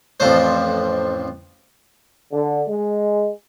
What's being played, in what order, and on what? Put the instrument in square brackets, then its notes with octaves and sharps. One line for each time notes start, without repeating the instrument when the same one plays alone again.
[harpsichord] A1 F2 F3 D4 C5
[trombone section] D3
G#3